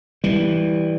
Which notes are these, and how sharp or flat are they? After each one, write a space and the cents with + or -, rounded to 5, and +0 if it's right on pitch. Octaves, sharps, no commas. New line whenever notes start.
E3 -10 G3 +0